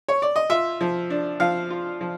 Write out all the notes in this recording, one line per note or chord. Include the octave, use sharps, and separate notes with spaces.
C#5
D5
D#5
F4 E5
F3
D4
F3 F5
F4
F3